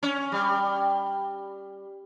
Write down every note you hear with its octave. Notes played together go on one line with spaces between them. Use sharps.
C#4
G3